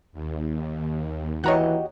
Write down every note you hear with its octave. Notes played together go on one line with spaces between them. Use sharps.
D#2
E3 F#4 G4 C#5 D#5 A#5 F#6